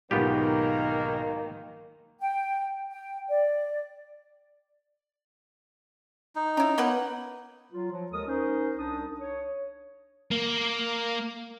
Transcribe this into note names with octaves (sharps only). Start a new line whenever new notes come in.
B1 G#2 D#3 A#3 B3 F4 G4
G5
G5
D5
D#4
C#4 E4 A#5
A#3 B3 B4 F#5
F#3 F4
F3 F#3
D#2 G#3 A4 A#4 D#6
C#4 D#4 A#4 C5
C2 D4 D#4 D#6
C#5
A#3